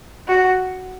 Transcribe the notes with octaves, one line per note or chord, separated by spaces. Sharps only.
F#4